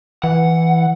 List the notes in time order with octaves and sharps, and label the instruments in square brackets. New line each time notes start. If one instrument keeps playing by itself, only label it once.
[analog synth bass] E3 [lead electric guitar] F#5